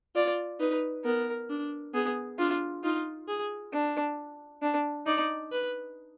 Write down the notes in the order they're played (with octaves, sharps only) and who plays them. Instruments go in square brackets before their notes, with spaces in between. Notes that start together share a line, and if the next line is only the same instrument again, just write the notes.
[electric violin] F4 [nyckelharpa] D5
[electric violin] D#4 [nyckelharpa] B4
[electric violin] B3 [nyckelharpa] A#4
[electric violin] D4
[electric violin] B3 [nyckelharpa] G#4
[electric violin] D4 [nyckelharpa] F4
[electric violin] D#4 [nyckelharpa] F4
[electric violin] G#4
[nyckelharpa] D4
D4
[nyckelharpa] D#4 [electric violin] D5
[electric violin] B4